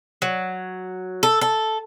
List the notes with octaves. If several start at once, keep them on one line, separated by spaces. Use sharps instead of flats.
F#3
A4
A4